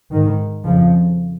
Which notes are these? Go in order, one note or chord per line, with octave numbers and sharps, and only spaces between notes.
G#2 D#3
F2 C#3 F3